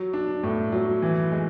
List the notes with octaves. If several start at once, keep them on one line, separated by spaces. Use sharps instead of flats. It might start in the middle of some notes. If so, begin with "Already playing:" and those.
Already playing: F#3
D4
A2
F#3
E3
G#3